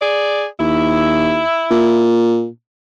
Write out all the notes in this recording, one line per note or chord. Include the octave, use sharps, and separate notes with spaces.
G#4 D5
D#2 E4
A#2